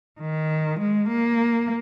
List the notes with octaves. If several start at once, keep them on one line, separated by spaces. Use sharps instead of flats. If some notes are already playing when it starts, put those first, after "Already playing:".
D#3
G#3
A#3